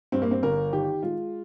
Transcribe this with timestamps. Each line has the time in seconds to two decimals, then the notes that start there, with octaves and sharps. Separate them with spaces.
0.12 G2 C4
0.22 A#3
0.31 C4
0.42 G1 A#4
0.72 D#3 G4
1.03 G#3 F4